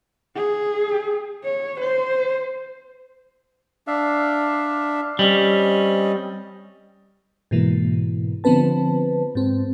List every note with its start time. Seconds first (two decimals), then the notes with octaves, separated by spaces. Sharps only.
0.36 G#4
1.44 C#5
1.80 C5
3.87 D4 E5 F5
5.19 G3 C4 C#4 D#5
7.51 G#2 B2 E3 A#3
8.44 D3 F3 B3 C4 B4 A5
9.35 G#2 C4